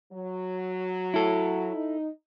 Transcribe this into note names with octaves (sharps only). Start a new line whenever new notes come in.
F#3
E4 A4
D#4